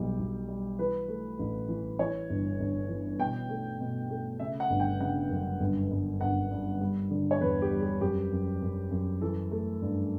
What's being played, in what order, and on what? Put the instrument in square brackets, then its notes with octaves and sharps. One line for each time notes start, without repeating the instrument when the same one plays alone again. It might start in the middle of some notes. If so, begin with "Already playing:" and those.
Already playing: [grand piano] B1 G3 G4
B1
G3
E3 B4
A3
A1
E3
E3 C#5
G1
G1
E3
B2 G5
A3
B2
A3
C#3 E5
F#5
G1
G5
C#3 F#5
F#2
G1
G1
G1 F#5
G2
G3
D3
C#5
E2 B4
G4
G3
G4
F#2 G4
F#2
F#2
F#2
E3 A4
A3
G2